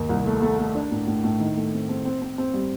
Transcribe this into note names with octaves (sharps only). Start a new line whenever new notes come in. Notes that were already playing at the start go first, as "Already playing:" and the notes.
Already playing: D#2
C2
A3
A3
A3
D4
A2
A2
A2
D#3
A3
C4
C4
C4
C4
C4
G3